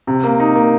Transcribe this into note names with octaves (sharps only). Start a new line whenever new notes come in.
C3
A#3
D#4
A#3